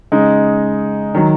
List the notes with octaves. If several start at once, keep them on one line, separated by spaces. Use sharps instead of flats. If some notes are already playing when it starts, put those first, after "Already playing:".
C#3 G#3 D#4
D#3 F#3